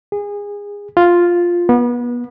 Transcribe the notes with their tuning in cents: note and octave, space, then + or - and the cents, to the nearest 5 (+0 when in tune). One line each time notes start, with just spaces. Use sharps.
G#4 -25
F4 +0
B3 -30